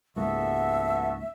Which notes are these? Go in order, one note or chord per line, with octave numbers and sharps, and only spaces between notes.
C#2 G#2 A#3 B3 F#4 A4 E5